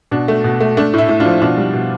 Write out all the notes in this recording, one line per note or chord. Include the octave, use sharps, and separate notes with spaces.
B2 D4
A3
B2
A3
A3 D4
A2 E4
A2
D4 F4
F3
B2 D4 F4
G3
B2